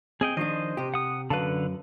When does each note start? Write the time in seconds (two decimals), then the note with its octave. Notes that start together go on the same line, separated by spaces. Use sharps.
0.21 C4 G#4 D#5 G5
0.37 D#3 F3 D4 C5 D#5
0.77 C3 G4
0.94 F#5 D#6
1.30 F#2 D3 B4 F5 A5